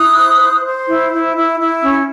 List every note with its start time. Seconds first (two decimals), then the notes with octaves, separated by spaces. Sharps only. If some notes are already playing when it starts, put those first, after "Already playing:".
Already playing: E4 D#6 F#6
0.18 C5
0.40 C5
0.65 C5
0.88 E4
1.12 E4
1.36 E4
1.59 E4
1.82 C#4